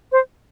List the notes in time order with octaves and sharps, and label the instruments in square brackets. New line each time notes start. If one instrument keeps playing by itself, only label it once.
[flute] C5